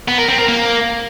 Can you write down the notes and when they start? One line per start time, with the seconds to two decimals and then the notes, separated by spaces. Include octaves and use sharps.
0.08 B3
0.18 A#4
0.28 C4
0.38 A#4
0.48 A#3